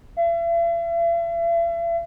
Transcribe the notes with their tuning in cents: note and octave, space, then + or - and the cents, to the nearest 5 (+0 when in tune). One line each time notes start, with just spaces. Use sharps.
E5 +45